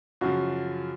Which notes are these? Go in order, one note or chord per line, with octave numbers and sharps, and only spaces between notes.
F#2 C#3 F3 F#4